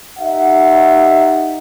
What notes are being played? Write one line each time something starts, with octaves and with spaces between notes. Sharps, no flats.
D#4 G4 E5 F#5